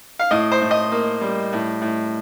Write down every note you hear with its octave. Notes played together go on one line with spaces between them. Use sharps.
F5
A2 D#5
C5
A2
D#5
A#3
G3
A2
A2